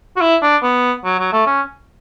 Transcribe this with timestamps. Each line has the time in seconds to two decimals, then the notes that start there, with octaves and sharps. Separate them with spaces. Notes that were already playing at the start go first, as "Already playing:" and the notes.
0.17 F#4
0.21 E4
0.42 D4
0.63 B3
1.05 F#3
1.19 F#3
1.32 A3
1.46 C#4